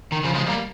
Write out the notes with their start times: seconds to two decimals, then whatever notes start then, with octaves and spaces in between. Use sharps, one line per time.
0.12 D#3
0.24 C#3 F3
0.35 F3 G#3
0.48 G3 A#3